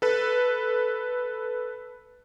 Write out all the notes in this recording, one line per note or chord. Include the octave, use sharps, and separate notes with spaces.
A4 B4